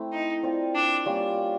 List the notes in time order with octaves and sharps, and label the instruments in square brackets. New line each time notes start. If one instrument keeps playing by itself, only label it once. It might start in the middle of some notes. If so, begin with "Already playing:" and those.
Already playing: [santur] A3 C4 E4
[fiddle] D#4
[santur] C4 F4 A#4 D5
[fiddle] D4
[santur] G3 A#3 C#4 F4